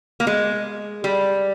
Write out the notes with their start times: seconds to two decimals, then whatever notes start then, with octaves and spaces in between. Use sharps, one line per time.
0.20 A#3
0.27 G#3
1.04 G3